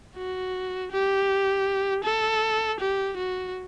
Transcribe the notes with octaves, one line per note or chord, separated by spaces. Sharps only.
F#4
G4
A4
G4
F#4